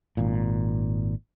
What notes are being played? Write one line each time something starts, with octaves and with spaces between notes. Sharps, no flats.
G#1 A#2